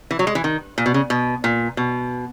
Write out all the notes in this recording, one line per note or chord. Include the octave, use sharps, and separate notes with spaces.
E3
F#3
G#3
E3
D#3
A#2
B2
C#3
B2
A#2
B2